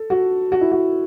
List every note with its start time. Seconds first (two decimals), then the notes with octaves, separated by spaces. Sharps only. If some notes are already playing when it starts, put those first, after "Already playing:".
Already playing: A4
0.10 F#4
0.52 F#4
0.61 E4
0.72 F#4